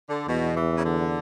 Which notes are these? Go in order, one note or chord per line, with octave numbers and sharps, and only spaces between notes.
D3
E2 B2
E3
C#3
D3